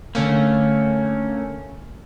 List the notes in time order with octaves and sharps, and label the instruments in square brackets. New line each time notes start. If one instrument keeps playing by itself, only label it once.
[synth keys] D3 A3 [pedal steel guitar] A#3 C#4